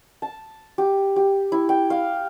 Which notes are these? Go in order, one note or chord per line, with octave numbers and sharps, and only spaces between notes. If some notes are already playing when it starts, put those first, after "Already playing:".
A5
G4
G4
E4
G5
F5